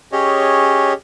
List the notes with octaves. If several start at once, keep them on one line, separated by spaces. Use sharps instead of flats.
C#4 G4 G#4 C#5 D#5